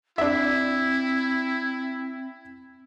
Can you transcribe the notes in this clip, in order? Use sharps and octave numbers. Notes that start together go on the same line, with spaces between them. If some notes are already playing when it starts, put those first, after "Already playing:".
C4 D4 E4 E5